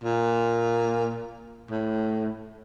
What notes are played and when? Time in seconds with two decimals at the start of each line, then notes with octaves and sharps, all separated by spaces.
0.04 A#2
1.70 A2